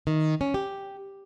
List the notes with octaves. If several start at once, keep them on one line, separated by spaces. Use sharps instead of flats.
D#3
C#4
G4